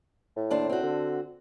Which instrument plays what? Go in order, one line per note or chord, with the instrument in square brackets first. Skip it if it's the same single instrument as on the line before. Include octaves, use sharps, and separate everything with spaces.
[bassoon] A2
[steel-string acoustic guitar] D#2 D4 C5
C4 F#4
[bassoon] D3